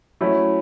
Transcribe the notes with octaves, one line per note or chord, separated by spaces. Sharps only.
F#3 A3 C#4 E4